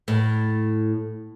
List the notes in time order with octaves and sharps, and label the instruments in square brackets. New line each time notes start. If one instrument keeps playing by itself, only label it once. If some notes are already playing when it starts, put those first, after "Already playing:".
[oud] A2